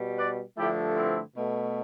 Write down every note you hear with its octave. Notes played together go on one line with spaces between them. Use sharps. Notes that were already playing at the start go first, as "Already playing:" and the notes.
Already playing: B2 G3
B4 D5
G2 D3 F3 A3 E4 G4
C4 E4
B2 A3